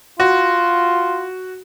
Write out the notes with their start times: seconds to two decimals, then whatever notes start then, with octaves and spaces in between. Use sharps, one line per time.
0.20 F4 F#4